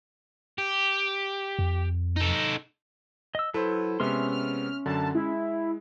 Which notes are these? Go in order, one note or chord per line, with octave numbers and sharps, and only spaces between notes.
G4
F2
D#4 A4
D#5 E6
F#3 E4 A4 B4 C5
C3 G#3 B3 C#4 E5 C6 F6
F6
F#2 D3 A5
G#3 E4